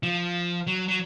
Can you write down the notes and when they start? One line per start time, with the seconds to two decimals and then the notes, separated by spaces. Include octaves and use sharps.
0.03 F3
0.67 F#3
0.88 F#3